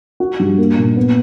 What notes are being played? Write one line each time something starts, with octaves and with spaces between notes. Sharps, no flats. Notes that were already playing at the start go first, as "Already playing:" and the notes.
F#4
G2
A#3
A#2
B3